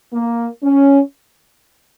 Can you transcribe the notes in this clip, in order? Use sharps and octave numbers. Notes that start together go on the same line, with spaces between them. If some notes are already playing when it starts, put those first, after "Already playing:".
A#3
C#4